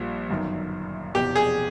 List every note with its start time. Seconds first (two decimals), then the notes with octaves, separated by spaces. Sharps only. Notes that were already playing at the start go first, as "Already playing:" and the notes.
Already playing: A#1 A#2 G3
0.30 G1 F#2 D#3
1.14 F1 E2 B2 G4
1.35 G#4